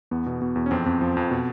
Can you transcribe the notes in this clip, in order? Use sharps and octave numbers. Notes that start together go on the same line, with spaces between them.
E2 B3
B2
B2
E2
C#4
F2 C4
F2
F3
F2
B2